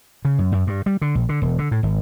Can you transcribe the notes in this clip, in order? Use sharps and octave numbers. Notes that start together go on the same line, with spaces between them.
C#3
F#2
F#2
G2
G3
D3
A#1
D3
E1
D3
A2
G#1